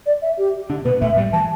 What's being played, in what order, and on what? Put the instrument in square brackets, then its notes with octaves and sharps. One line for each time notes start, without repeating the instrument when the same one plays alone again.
[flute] D5
E5
G4
[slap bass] D3 D4
[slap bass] B2 B3 [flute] B4
[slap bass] A2 A3 [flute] E5
[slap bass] G2 G3
[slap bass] E3 [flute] A5